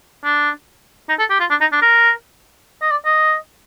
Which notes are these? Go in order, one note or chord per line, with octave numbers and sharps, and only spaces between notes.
D4
D#4
A4
G4
F4
D4
D#4
D4
A#4
D#5
D5
D#5